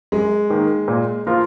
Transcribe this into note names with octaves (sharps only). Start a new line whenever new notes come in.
F#2 G#3
D#3 A#3
A#2
F3 A#3 F4 A#4